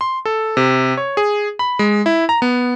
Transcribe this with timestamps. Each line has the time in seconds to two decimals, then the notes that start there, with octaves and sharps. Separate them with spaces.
0.01 C6
0.25 A4
0.57 C3
0.97 C#5
1.17 G#4
1.59 B5
1.79 G#3
2.06 E4
2.29 A#5
2.42 B3